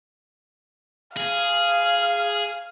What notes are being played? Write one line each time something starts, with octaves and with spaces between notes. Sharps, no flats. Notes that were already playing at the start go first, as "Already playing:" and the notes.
G#4 F5